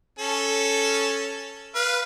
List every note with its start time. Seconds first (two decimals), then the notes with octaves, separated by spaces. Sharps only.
0.19 C#4 A4
1.75 B4 F5